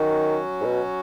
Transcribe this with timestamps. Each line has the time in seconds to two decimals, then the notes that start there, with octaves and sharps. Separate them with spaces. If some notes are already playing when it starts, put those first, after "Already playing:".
Already playing: D#3 F#3 C#4 F#4
0.61 G#2
0.65 B2